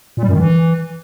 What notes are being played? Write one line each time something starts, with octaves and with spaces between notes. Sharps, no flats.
A#2
G3
F#2
D#3
E3